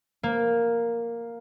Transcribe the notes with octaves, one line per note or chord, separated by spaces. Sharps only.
A#3